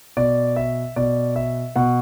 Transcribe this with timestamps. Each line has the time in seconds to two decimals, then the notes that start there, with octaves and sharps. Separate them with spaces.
0.17 B2 D5
0.56 E5
0.96 B2 D5
1.36 E5
1.76 B2 F#5